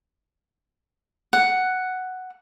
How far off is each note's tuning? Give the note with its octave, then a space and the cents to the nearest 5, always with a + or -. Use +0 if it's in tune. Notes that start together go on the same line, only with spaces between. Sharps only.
F#5 +5